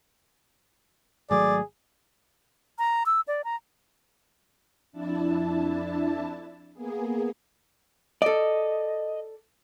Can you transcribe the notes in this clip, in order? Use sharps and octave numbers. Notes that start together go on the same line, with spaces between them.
G#1 F#3 A3 G#4 D5
A#5
E6
D5
A#5
F2 D4 E4 A5
A#3 B3 G#4
A4 D5 D#5